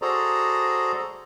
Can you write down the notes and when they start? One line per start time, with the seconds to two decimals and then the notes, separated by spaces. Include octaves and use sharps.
0.02 F#4 G#4 A4 C5 D5 A#5